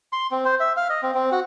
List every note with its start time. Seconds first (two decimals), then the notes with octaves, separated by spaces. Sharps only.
0.13 C6
0.31 C4
0.45 C5
0.60 E5
0.77 F5
0.90 D#5
1.03 C4
1.15 C4
1.32 F#4